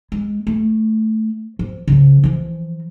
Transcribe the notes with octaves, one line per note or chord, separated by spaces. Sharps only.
G#3
A3
F3
C#3 F3
E3 F3